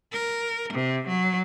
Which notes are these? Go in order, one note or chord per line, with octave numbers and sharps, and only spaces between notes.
A#4
C3
F#3